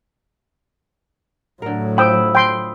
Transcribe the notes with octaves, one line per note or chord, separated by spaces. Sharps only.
A2 D3 F#3 A#4
F3 G5 B5 D#6 E6
G5 C6